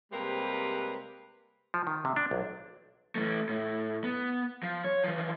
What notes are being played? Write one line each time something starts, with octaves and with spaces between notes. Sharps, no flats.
C3 G3 G#3 A#3 C4 B4
F3
D#3
C3
D4
B1
E3 A3
A2
B3
F3
C#5
E3 F3